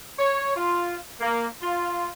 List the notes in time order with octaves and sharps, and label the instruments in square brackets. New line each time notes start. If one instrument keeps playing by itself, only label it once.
[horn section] C#5
F4
A#3
F4